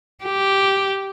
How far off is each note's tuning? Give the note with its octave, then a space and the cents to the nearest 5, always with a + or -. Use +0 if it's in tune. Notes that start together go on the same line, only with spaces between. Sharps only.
G4 -5